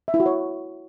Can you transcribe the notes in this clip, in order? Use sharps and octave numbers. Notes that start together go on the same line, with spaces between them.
E5
E4
F#4
C#5